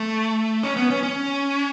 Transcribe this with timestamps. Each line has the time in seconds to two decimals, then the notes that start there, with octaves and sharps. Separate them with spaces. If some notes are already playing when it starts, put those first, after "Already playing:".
Already playing: A3
0.63 C#4
0.76 B3
0.90 C#4
1.03 C#4